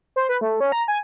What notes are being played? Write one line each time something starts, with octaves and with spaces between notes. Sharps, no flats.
C5
B4
A3
C#4
A#5
G#5